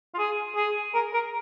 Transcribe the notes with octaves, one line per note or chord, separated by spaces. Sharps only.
F4
G#4
G#4
A#4
A#4